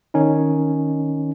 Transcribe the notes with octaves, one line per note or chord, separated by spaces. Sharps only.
D#3 C#4 D#4